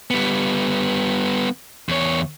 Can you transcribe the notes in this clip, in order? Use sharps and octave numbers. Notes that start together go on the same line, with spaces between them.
G3 B3
E2 C#5